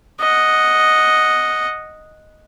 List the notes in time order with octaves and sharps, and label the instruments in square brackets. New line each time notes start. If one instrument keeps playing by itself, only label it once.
[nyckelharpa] D#5 F#5